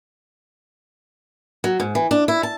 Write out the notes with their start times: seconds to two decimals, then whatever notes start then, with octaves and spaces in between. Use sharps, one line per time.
1.64 F#3
1.80 G#2
1.95 E3
2.11 D4
2.28 E4
2.43 A5